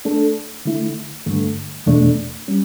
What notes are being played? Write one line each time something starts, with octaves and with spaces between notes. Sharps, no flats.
A3 D4 A4
D3 A3 E4
G2 D3 A3
E2 B2 A3 D4
G3 C#4